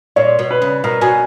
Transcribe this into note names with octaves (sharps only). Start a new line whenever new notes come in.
A#2 C#5
B2
B4
C#3
B2 A#4
B2 G#5